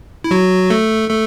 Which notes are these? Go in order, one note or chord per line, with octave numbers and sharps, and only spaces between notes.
E4
F#3 F#4
A3 A4
A3 A4